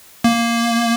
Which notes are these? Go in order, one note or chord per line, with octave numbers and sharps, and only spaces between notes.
A#3